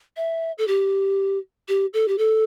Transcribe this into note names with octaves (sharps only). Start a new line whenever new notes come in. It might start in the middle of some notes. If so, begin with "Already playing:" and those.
E5
A4
G4
G4
A4
G4
A4